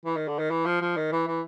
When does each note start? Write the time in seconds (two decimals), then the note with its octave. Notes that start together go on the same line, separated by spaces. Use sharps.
0.05 E3
0.16 D#3
0.28 D3
0.39 D#3
0.51 E3
0.66 F3
0.82 F3
0.97 D#3
1.12 E3
1.27 E3